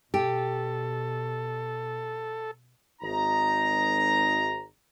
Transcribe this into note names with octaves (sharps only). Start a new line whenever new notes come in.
B2 G4 A4
G#1 D#4 A#5